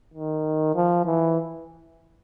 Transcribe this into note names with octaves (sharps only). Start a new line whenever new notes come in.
D#3
F3
E3